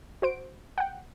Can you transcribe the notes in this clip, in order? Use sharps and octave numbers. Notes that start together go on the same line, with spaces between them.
F#4 C5 D7
F#5 G5